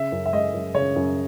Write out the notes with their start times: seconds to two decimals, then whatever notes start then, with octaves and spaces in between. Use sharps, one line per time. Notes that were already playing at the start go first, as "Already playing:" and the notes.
Already playing: C#3 E5
0.12 F#2
0.25 E5
0.33 G#3 D#5
0.54 F#2
0.74 C#3 C#5
0.96 F#2